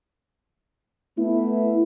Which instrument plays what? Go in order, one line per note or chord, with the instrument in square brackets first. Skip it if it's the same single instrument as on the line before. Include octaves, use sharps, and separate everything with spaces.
[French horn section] A3 B3 E4